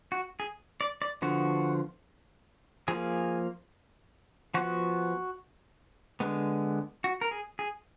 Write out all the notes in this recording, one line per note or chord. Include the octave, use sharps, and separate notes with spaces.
F#4
G#4
D5
D5
D3 F3 B3 F#4
F3 A#3 G#4
F3 B3 F#4
D3 G#3 B3
F#4
A#4
G#4
G#4